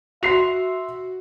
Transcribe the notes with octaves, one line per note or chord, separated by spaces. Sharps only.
F#4 E5 C6 C7 F7